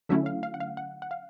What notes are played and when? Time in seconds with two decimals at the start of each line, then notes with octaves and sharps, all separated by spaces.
0.09 D3 F#3 A3 C#4 E4 E5
0.26 F5
0.43 F5
0.54 F#5
0.60 F5
0.77 F#5
1.02 F#5
1.11 F5